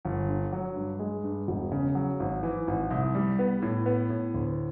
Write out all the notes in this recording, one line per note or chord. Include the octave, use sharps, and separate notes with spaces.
G1
D3
F#3
G2
G#3
G2
E1
C#3
F#3
G#1
E3
G#1
C2
G3
B3
A2
B3
A2
D2